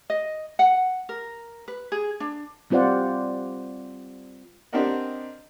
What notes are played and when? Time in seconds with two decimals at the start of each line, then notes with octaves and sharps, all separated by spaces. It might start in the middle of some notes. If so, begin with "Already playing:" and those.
0.10 D#5
0.59 F#5
1.09 A#4
1.68 B4
1.92 G#4
2.20 D4
2.70 G3 C4 F4 C5 D5 F#5
4.73 C4 D4 G4 A#4 D#5 F#5